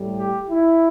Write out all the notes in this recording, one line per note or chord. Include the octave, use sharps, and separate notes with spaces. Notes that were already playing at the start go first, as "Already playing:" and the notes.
Already playing: A2 G3
G4
E4